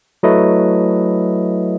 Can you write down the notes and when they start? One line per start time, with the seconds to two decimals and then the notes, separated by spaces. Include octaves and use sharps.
0.23 F#3 A3 E4 B4 D#5